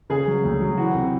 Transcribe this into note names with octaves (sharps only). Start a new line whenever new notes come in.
C#3 G#4
F#3
D2
F#3
E3 F#4
C3